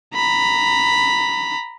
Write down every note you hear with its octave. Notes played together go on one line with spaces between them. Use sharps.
A#5 B5